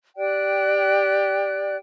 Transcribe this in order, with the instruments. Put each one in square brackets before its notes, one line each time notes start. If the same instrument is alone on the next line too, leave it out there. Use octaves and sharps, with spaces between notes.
[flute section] G4 D5 G5 F#6